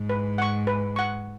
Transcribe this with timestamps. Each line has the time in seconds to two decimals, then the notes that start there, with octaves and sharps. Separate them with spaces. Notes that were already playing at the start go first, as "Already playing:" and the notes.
Already playing: G#2
0.10 B4
0.38 F#5 C#6
0.67 B4
0.96 F#5 C#6